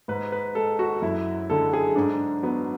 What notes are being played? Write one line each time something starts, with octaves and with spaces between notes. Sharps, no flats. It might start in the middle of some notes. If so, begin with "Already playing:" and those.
G#2 B4
B4
G#3 A4
F#4
F#2 E4
D3 G#3 A4
G#4
G#2 D4
F#3 B3